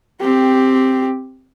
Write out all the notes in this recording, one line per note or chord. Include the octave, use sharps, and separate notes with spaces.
C4 G4